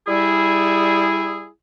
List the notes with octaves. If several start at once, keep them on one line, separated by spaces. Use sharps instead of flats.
G3 E4 G#4